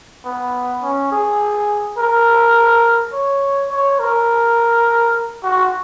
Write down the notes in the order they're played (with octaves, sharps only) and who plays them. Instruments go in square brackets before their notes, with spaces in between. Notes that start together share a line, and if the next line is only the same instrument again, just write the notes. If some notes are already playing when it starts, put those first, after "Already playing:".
[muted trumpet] B3
C#4
G#4
A#4
C#5
C#5
A#4
F#4